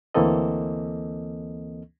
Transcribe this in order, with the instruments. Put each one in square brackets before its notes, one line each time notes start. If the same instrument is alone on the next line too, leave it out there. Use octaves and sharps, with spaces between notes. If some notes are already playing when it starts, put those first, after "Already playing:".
[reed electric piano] D2 E3 A#3 C4 A4 D#5